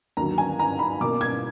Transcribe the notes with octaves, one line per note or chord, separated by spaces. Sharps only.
D#2 D3 F#3 A#5
G#5
A#5
B5
B2 A#3 D6
G#6